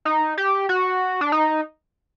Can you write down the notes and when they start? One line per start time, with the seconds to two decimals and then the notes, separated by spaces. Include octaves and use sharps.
0.05 D#4
0.38 G4
0.69 F#4
1.21 D4
1.32 D#4